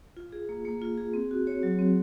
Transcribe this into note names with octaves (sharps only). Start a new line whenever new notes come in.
F4
G#4
A#3
A#3
F4
G#4
C4
F#4
C#5
F#3
C4